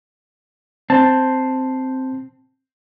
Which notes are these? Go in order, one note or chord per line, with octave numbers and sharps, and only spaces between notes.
C4 A5